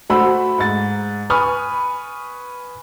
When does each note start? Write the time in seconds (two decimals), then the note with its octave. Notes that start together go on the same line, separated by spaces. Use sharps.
0.10 A3 F#4 C5 F#5 B5 E6
0.58 G#2 A6
1.30 B4 G#5 B5 C#6 D#6 F6